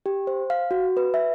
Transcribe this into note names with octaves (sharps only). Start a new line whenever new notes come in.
G4
C5
F5
F#4
B4
E5